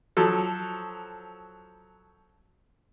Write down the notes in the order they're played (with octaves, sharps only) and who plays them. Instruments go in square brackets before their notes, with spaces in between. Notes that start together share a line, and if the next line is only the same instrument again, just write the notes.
[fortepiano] F3 F#3 A4